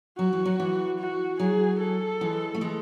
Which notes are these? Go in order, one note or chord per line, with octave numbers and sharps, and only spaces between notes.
F#3 F#4
E3
F#3
E3
F#4
F#3 G#4
A4
E3 G#3
A3
E3 G#3